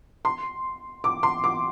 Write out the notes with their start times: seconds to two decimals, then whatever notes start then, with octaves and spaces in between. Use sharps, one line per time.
0.25 C6
1.04 D6
1.23 C6
1.44 D6